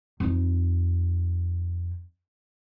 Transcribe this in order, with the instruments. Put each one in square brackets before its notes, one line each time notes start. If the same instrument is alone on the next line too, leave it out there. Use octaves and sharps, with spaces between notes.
[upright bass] F2 D#4